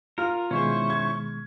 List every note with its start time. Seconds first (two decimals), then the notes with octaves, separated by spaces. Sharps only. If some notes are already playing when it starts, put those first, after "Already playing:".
0.18 F4 A#4 F6
0.51 B2 D#3 G#3 C#4 E4 C5 C#6
0.90 G#6